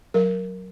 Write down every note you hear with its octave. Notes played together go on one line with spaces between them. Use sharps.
F#3 A#4